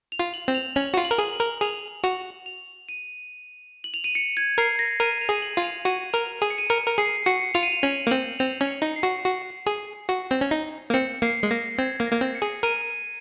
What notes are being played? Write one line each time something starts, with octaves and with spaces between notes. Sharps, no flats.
F7
F4
F#7
C4
F7
C#4 F#7
F#4
F4
F#7
A#4
G#4
F#7
A#4
G#4 F7
F#4 F7
F7
D#7
F#7
F7
D#7
C#7
G#6
A#4 C7
A#6
A#4 D#7
F7
G#4
F#7
F4
F7
F#4 D#7
A#4 F7
G#4 D#7
C#7
D#7
A#4 C#7
A#4
G#4 C7
F#4 C#7
F4 F7
D#7
F7
C#4 F#7
A#3
C4 F#7
C4 F7
C#4
C#7
D#4
C7
F#4
F#4
G#4
F#4
C4
C#4
D#4
A#3
C4 C#7
A#3 C7
G#3
A#3 A#6
C4 G#6
A#3
A#6
A#3
C4
C#7
G#4
A#4 D#7